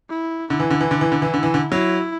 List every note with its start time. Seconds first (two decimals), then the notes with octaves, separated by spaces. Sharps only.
0.09 E4
0.50 D3 E4
0.60 E3
0.70 D3
0.81 E3
0.91 D3
1.01 E3
1.12 D3
1.22 E3
1.34 D3
1.43 E3
1.54 D3
1.72 F#3 E4